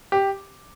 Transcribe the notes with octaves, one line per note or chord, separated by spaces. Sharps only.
G4